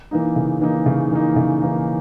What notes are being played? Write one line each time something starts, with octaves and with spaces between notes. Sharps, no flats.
E3 A#3 D#4
C#3
E3 A#3 D#4
C#3
E3 A#3 D#4
C#3
E3 A#3 D#4